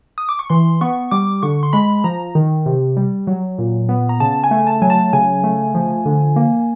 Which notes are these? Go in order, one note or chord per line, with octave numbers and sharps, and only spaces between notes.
D#6
D6
C#6
E3 C6
B3 C#6
G3 D6
D3 C#6
C6
G#3 B5
F3 A#5
D#3
C3
G3
F#3
A#2
B3
A#5
C#3 A5
G#5
A3
A5
F#3 G#5
A5
C#3 G#5
A3
F3
D3
A#3